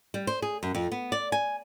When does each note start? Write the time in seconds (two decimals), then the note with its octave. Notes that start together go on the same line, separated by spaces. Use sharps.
0.14 G3
0.27 C5
0.42 G#4
0.63 F#2
0.75 F2
0.92 B3
1.12 D5
1.32 G#5